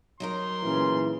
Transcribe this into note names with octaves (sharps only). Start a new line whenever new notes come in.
F#3 D#4 A#4 C6
A#2 C#3 E3